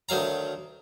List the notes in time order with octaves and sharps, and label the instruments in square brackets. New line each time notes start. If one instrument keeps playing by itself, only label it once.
[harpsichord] D2 D#3 F#3 F5 A#5